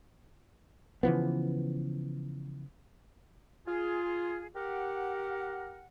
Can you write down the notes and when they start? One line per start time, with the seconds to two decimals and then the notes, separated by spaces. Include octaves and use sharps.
1.03 C#3 E3 F3 B3
3.67 F4 G#4
4.56 G4 A#4 F#5